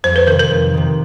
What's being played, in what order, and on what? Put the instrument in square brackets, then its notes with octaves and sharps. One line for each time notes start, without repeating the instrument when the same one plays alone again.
[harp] F2 [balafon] C5
[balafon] B4
[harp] D#3 [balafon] A#4
[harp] C3
[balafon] A#4
[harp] F2
C3 D#3